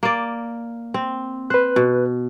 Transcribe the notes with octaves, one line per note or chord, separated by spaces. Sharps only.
A#3 D5
C4
B4 C5 F#6
B2